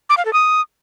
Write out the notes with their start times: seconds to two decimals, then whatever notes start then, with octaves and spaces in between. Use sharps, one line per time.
0.10 D6
0.18 F5
0.25 A4
0.33 D#6